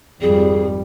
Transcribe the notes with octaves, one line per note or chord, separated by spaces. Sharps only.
G#1 F2 G3 G#4